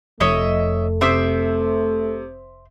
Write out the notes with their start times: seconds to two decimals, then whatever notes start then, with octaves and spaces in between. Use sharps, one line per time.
0.20 F1 F2 A3 C#5 D#5 E5
1.01 C3 C5 E5 D6 D#6 B6